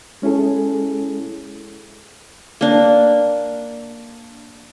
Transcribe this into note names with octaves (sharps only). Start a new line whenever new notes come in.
G#3 C#4 E4 G#4 A4
A#3 D4